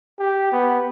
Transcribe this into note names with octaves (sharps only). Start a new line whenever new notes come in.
G4
B3